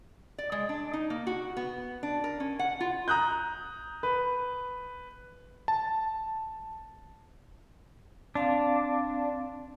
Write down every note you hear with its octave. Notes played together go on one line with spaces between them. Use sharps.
D5
G#3
D4
D#4
A#3
F#4
B3
D4
A#4
C#4
F#5
F4
A#5 D#6 F#6 G6
B4
A5
C4 D4 F5